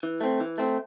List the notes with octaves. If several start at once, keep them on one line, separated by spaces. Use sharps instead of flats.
E3
A3 C4
E3
A3 C4